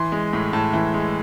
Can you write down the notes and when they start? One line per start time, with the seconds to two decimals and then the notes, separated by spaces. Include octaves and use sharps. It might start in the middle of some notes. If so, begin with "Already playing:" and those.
Already playing: E3 C6
0.12 G#3
0.33 A2
0.53 A2 A5
0.73 E3
0.94 G#3